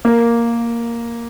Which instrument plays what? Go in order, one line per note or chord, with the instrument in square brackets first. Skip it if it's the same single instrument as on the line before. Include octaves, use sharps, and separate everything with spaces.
[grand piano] A#3